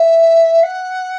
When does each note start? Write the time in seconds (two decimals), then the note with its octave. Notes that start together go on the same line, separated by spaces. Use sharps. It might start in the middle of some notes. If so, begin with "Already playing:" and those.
Already playing: E5
0.63 F#5